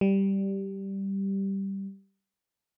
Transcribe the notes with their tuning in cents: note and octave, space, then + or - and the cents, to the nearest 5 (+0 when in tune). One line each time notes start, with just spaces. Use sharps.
G3 -5